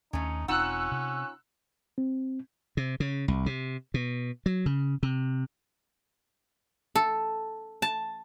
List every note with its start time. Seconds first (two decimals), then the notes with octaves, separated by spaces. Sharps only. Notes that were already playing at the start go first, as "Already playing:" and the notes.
0.13 D#2 A3 C#4 D#4
0.48 E1 C4 C#4 D#4 F4 F#5 E6 F#6
0.91 C3
1.98 C4
2.77 C3
3.00 C#3
3.28 C2
3.46 C3
3.94 B2
4.46 F#3
4.66 C#3
5.03 C3
6.95 A4
7.82 A5